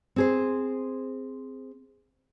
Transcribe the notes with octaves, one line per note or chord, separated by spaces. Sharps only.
C4 G#4 C5